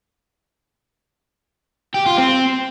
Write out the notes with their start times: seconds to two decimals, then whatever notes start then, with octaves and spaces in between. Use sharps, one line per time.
1.94 G4
2.06 F4
2.18 C4